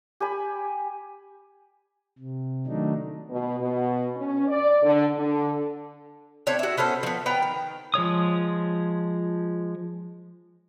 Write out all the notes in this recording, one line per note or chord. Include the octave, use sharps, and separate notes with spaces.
G4 G#5 B5
C3
D#3 F#3 A3 D4 D#4
B2
B2
C#4
D5
D3
D3
A3 C4 D4 C#5
F#4 E5
B3 C#4 A4 C5
F3 B3
B3 G5 A#5
D#3
F3 G#3 C#5 D#6